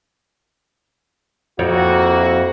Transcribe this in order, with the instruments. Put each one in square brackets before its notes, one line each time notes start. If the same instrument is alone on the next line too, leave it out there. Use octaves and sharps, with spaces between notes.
[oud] F2 [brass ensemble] A#3 E4 F#4